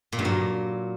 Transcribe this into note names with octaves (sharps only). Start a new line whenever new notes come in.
A#2
G2
F#3